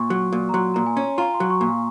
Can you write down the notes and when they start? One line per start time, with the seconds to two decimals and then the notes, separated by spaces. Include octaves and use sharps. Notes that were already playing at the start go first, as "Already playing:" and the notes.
Already playing: A#2 C6 C#6
0.10 F#3
0.32 A#2
0.49 A#5
0.54 F#3 C6
0.74 A#2 A#5
0.86 G#5
0.97 C#4
1.18 F4 A#5
1.34 C6
1.40 F#3
1.50 C#6
1.61 A#2
1.67 F5